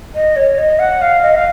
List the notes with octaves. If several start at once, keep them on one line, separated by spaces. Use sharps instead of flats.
D#5
C#5
D#5
F#5
F5
D#5
F5